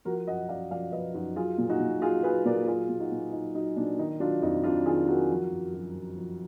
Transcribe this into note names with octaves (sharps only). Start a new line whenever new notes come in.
F3 F#4 A#4
F#2 D#5 F#5
F#2 D5 F5
F3 D5 F5
F3 B4 D#5
F#2 D#4 F#4
F#3 F4 G#4
A#2
D#4 F#4
A#2
F#3 F4 G#4
F#3 G#4 B4
A#2 A#4 D5
F#3 F4 G#4
A#2
D#4 F#4
A#2
F#3 D#4
F#3 D#4
A#2 D4
D#3 D#4
F#3 D4 F4
F2 D#4
F2 D4 F4
D#3 F4 G#4
F#3 F#4 A#4
F3
F#2
F#2
F3
F3